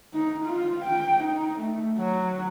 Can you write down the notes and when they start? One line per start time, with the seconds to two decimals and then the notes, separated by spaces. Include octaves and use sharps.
0.14 D#4
0.45 F4
0.85 G5
1.24 D#4
1.60 A3
1.98 F#3